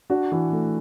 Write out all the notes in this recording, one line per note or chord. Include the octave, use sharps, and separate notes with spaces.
D4 F#4
E3
A3